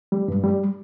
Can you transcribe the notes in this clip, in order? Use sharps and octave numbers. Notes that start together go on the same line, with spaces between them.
G3
G2
G3